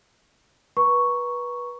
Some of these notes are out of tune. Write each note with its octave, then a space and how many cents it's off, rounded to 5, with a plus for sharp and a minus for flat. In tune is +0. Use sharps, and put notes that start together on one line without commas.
B4 -25 A#5 +25 C#6 +0